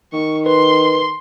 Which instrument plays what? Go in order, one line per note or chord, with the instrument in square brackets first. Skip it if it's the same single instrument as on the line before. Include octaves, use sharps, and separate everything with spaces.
[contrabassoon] D#3 [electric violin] C#6
[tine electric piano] B4 [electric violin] C6